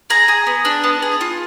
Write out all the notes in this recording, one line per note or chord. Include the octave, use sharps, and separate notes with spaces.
G#4 A#5
G#4
B3
D4
B3
G#4
F4